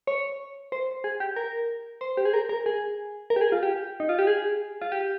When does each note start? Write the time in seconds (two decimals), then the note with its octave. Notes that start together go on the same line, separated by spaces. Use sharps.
0.07 C#5
0.72 C5
1.04 G#4
1.20 G4
1.36 A#4
2.01 C5
2.17 G4
2.25 G#4
2.34 A#4
2.49 A#4
2.66 G#4
3.30 A#4
3.36 G4
3.41 G#4
3.52 F4
3.63 G4
4.00 D#4
4.09 F4
4.19 G4
4.27 G#4
4.82 F4
4.92 G4